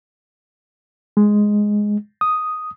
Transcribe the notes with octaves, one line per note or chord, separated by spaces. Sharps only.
G#3
D#6